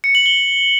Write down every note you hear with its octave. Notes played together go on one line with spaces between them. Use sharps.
C#7
F#7
G7